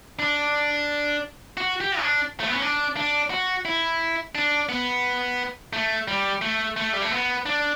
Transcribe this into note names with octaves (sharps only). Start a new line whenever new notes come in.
D4
F#4
G4
C#4
D4
A3
B3
C#4
D4
D4
F#4
E4
D4
B3
A3
G3
A3
A3
G3
A3
B3
D4